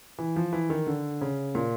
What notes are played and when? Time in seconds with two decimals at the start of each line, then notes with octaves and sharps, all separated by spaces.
0.18 E3
0.36 F3
0.53 E3
0.70 D#3
0.87 D3
1.21 C#3
1.55 A#2